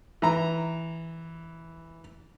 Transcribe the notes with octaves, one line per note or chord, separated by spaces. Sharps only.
E3 A#5